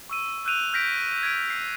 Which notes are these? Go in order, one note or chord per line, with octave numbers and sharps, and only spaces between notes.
C#6 E6 D#7
E6 F#6 G6 D#7 F7
F6 G6 A#6 B6 D7
G#6 A#6 D7
C7